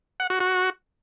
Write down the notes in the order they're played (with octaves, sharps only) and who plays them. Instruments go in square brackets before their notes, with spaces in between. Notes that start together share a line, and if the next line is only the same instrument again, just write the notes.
[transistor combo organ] F#5
F#4
F#4